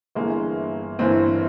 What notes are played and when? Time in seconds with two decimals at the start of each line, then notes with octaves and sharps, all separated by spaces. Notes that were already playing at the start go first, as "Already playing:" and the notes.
0.15 G1 G2 E3 G#3 A#3
0.99 G1 G2 E3 A#3 C4